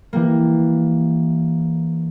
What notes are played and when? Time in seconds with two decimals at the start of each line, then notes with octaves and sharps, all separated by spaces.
0.13 E3 G3 A#3